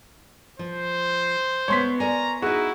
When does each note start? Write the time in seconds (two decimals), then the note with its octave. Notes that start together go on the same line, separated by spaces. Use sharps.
0.59 F3 C5
1.68 G#3 B3 C#5 C6 B6
2.00 A#4 D5 G#5 A#5
2.42 D#4 E4 F#4 G#4